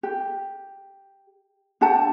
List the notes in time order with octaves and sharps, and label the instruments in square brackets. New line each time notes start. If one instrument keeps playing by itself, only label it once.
[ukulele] G4
D4 G4 F#5 A5